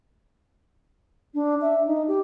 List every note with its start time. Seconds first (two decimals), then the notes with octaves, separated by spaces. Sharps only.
1.34 D4
1.61 E5
1.87 D#4
2.08 G4